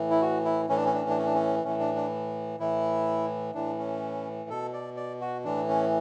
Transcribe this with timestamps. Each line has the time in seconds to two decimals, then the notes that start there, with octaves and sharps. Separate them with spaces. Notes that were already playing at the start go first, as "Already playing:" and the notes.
Already playing: A2 E3
0.11 E4
0.22 F#4
0.45 E4
0.69 A2 E3 C#4
0.77 D4
0.85 C#4
0.94 D4
1.01 C#4
1.09 D4
1.18 C#4
1.25 D4
1.34 C#4
1.64 A2 E3 C#4
1.80 D4
1.95 D4
2.59 A2 E3 E4
3.55 A2 E3 D4
3.78 C#4
4.50 B2 A4
4.73 D5
4.97 D5
5.21 F#4
5.44 A2 E3 D4
5.69 C#4